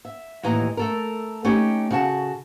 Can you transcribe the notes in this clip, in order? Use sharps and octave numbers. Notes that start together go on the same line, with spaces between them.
E5
D#2 A2 E3 D#5 A#5
A3 A4 A#4
A3 C#4 D#4 G4
C#3 F#4 A5